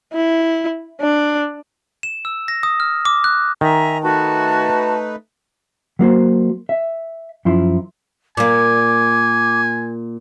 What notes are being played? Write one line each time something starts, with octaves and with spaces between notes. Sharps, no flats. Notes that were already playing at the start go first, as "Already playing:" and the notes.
E4
D4
E7
E6
A#6
D#6
F6
D6
F#6
D#3 E5 G#5 A#5
A3 D#4 F#4 B4 A5
F#3 A#3 F#4 C5
E5
F#2 F3 E4 C6
A#2 A#3 G#5 D6